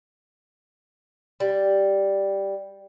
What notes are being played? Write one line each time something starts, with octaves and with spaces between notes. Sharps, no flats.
G3